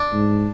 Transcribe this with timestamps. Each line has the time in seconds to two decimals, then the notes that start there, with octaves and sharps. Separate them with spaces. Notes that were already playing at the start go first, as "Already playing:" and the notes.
Already playing: D4
0.13 G#2